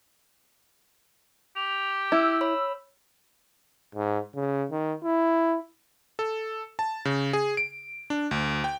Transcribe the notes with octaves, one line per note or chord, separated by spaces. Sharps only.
G4 F7
E4 E6
C#5 B5
G#2
C#3
D#3
E4
A4
A5
C#3
G#4
D7
D4
D2
G5